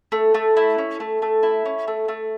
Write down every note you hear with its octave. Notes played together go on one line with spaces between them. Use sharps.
A3
A3
E4
C#4
A3
A3
E4
C#4
A3
A3